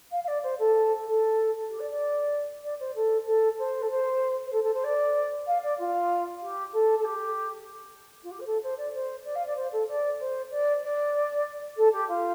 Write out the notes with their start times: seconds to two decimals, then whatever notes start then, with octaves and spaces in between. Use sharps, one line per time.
0.11 F5
0.23 F5
0.27 D5
0.42 C5
0.59 A4
1.06 A4
1.69 G4
1.79 D5
1.90 D5
2.63 D5
2.79 C5
2.95 A4
3.26 A4
3.58 C5
3.82 A4
3.90 C5
4.45 C5
4.52 A4
4.63 A4
4.73 C5
4.84 D5
5.47 F5
5.62 D5
5.78 F4
6.41 G4
6.72 A4
6.98 A4
7.04 G4
8.23 F4
8.31 G4
8.39 C5
8.46 A4
8.62 C5
8.77 D5
8.93 C5
9.25 D5
9.35 F5
9.46 D5
9.56 C5
9.72 A4
9.88 D5
10.19 C5
10.51 D5
10.82 D5
11.77 A4
11.92 G4
12.08 F4